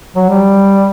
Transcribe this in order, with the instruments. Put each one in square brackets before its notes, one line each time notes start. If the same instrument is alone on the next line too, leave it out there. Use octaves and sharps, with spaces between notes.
[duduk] F#3
G3